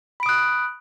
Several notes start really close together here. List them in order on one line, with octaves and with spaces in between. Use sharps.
B5 D7 D#6 F#6